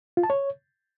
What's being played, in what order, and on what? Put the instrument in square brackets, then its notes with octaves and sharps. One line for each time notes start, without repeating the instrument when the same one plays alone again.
[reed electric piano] F4
A5
C#5